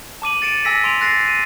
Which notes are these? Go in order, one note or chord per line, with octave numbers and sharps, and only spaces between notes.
A5 D6 D#7 F#7
A6 C#7 D7 E7
G#5 E6 A#6 B6
C6 D7 F7
F#6 A6 A#6 C7
D#7